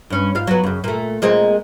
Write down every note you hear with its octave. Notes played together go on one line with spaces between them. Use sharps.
G2 C#4
G#2 F4 F5
F#3 B3
F#2 C#3
A#2 A3
A#2 G#3 C4